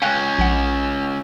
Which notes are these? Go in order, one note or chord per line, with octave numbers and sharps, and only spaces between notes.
C#2 C#4 F5 G5 F#6
A#1 F#5